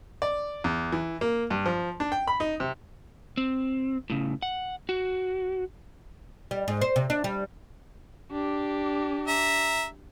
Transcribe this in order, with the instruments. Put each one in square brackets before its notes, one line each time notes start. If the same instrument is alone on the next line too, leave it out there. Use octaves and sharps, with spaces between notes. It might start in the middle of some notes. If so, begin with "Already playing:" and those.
[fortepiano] D5
E2
E3
A#3
G2
F3
D4
G5
B5
D#4
C3
[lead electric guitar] C4
A2 C#3
F#5
F#4
[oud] G3
G#2
C5
C3
D4
G3
[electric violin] D4 G4
[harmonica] E5 A#5